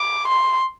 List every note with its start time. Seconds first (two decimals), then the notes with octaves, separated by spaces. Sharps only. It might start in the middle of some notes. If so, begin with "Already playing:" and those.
Already playing: D6
0.28 C6